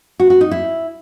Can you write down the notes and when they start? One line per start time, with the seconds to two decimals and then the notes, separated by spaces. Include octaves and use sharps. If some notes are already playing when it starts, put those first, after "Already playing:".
0.20 F#4
0.30 F#4
0.41 D#4
0.51 E4